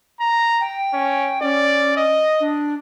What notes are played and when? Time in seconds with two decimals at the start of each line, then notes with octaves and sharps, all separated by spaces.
0.20 A#5
0.60 G5
0.94 C#4
1.42 C#4 D5
1.97 D#5
2.40 D4